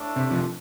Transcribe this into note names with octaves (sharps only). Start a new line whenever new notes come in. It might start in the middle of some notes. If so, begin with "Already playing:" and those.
Already playing: A2 A3 D4
C3
C3 F3